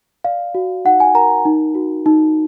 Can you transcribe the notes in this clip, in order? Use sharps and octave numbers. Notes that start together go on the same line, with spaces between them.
D5 F5
F#4
D#4 F#5
G#5
A#4 A#5
D#4
F#4
D#4